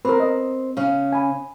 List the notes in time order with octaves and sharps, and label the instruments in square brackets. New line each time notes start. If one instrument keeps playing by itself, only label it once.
[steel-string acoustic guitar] C4 [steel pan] A#4 B4
[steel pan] D#5
[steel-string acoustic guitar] C#3 C#4
[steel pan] G#5 B5